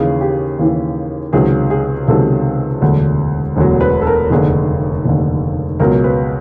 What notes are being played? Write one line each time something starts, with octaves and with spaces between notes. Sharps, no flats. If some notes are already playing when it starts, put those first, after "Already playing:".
Already playing: D#2 C#3 E3 G#4
G4
D#2 C#3 E3
C#2 C3 D#3 F#3 G#4
G#4
C#2 C3 D#3 F#3 A4
E1 D2 D3 F#3
E1 D2 D3 F#3
B4
A4
A#4
F1 D#2 D3 G#4
F1 D#2 D3
C#2 B2 F#3 A#4
B4